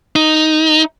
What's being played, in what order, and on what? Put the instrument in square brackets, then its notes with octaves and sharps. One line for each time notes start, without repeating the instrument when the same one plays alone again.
[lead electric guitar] D#4